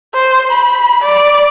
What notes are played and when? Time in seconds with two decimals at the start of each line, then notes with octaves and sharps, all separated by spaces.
0.14 C5
0.52 B5
1.04 D5